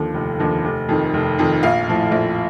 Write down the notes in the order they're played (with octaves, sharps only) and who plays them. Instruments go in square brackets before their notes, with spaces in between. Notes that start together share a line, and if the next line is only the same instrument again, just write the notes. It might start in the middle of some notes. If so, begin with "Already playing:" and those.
Already playing: [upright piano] D#2 D3 F3
F1
D#2 D3 F3
F1
F2 D#3
F1
F2 D#3
A#1 F5
A2 F3
A#1